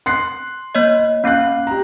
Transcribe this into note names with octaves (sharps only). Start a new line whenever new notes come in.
C6 F#6 C7
A#3 C#5 D#5
A#3 C#4 F5 F#6 C7
G4 A#5